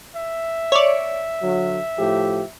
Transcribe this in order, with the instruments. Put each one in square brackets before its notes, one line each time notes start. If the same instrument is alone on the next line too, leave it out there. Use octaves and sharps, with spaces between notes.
[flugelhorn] E5
[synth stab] C#5 D5
[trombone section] D3 F#3
A2 F3 G4